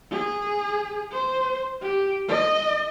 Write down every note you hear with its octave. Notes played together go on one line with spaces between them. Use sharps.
G#4
C5
G4
D#5